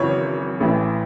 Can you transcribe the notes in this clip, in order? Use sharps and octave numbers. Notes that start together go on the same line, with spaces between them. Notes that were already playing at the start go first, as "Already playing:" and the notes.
Already playing: G#1 F#2 C#3 E3 C#5
A1 A2 E3